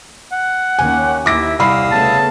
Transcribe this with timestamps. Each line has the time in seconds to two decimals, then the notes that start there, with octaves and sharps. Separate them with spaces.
0.32 F#5
0.79 D#2 C#4 G4 G#5
1.26 D#2 E4 E5 D6 A#6 D7
1.59 C2 F5 B5 D#6 E6 C7
1.92 C#3 A3 B3 A5